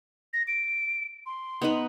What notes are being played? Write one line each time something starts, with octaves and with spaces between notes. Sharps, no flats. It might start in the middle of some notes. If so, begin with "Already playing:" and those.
A#6
D7
C6
B3 D#4 B4